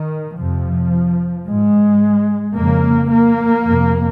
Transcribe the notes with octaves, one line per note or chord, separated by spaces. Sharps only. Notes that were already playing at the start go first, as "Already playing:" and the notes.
Already playing: D#3
F2 C3 F3
G#2 G#3
F2 C#3 A#3
A#3
F2 C3